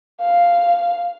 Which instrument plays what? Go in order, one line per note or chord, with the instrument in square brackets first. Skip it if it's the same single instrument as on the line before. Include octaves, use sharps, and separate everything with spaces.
[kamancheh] F5